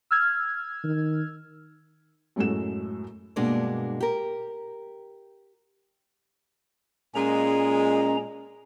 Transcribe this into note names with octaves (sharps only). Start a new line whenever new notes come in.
E6 F6 G#6
D#3
F#2 A2 G#3 A3 F#4 E7
G2 B2 G#3 A#3 D4
G4 A#4
A#2 G#3 C#4 A#5